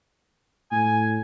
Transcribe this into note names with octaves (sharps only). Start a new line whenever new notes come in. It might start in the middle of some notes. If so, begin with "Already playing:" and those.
A2 G#5